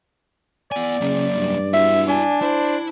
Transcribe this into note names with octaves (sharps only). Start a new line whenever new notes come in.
B3 D5 G#5
C#3 F#3 A#3
G2
E4 F#4 E5
D4 G#5
E4 C5